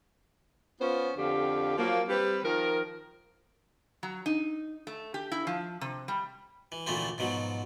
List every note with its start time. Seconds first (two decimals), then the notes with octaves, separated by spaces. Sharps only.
0.80 B3 C#4 F4 C5
1.17 F2 D3 G4 F5
1.77 F3 F#3 A#3
2.08 G3 C4 B4
2.43 D#3 F3 A#4
4.03 F#3
4.26 D#4
4.87 A3
5.14 G4
5.32 E4
5.47 F3
5.81 C3
6.08 G3
6.72 E3
6.87 D2 A#2 E3 F3 A3 C4
7.18 G#2 B2 F3 F#3